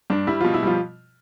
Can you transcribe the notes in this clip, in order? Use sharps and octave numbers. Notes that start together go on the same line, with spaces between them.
G2 D4
G3 E4
B2 F3 F4
E4
F3 G3 F4